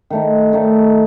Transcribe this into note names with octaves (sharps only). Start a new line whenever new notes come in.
D#3 A3 D#4
D#3 A3 D#4